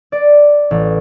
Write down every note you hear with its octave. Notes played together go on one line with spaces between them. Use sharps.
D5
A1